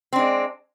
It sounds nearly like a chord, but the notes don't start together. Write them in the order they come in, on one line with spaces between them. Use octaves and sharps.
C4 D4 G#3